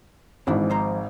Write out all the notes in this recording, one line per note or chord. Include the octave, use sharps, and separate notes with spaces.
G#1 G#2 E3 D4 E4
F3 C5 A#5